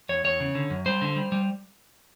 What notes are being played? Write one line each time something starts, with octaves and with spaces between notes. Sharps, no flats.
E2 C#5
E2 C#5
C#3
D3
F#2
G3 C5
D3
G3
G3